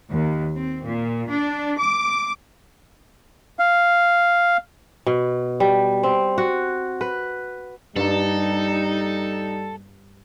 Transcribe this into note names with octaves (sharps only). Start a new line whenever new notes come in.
D#2
C4
A#2
D4
D6
F5
B2
G3
C4
F#4
B4
G2 G3 A#3 D#4 A4